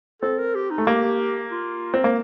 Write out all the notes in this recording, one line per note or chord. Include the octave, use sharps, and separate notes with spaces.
C4 A4
A#4
G4
D#4
A3
A#3 G4
F4
C4
A#3